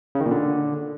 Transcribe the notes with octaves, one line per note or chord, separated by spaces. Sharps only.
C#3
D#3
A#2
D3